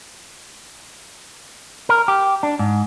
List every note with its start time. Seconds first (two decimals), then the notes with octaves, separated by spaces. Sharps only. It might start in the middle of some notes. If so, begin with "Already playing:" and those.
1.89 A#4
2.08 G4
2.43 D4
2.59 G#2